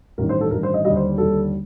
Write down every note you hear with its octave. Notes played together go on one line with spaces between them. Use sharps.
A1 G2 D#3 A#4
C5
A4
A1 G2 D#3 A#4
C5
D#5
D#2 D3 G3 D#5
C5
D#2 D3 G3 A4